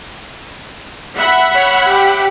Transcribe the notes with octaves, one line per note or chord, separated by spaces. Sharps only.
E5 F#5 B5
C#5
G4